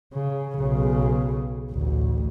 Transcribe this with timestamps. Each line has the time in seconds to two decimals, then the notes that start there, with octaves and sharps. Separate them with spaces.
0.13 C#3
0.59 B1 C#3
1.72 A1 D2